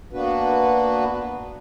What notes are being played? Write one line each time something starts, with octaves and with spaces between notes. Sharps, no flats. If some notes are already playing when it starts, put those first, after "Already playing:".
A#3 B3 D4 F#4 B4